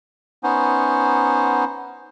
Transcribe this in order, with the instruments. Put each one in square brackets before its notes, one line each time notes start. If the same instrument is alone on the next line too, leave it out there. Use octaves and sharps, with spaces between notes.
[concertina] B3 C#4 D#4 C5